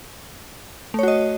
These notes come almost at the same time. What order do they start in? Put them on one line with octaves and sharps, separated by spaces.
A3 C#5 F#4 D#5